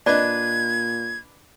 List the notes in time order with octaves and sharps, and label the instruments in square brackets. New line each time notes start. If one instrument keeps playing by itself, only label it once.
[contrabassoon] A#2 [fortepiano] D4 B4 [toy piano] D5 D#5 [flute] G#6